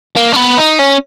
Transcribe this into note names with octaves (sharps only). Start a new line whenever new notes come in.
A#3
C#4
B3
D#4
C#4